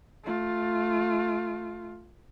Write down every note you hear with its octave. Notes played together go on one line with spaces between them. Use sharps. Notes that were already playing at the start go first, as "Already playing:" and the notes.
A3 F4